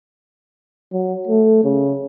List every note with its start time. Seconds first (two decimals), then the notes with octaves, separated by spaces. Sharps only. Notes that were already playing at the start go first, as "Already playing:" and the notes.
0.92 F#3
1.27 A3
1.64 C#3